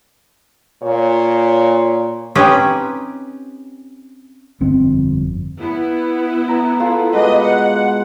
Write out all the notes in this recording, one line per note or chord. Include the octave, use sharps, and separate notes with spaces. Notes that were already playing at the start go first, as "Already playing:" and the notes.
A#2 C#5
C4 C#4 D#4 G4 B4 D#5
G1 F2 C4
B3 E4
A#5
F4 A4 F5
B2 G#3 B4 D#5 D6
F#5